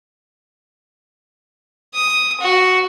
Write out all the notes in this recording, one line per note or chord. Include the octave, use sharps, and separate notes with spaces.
D#6
F#4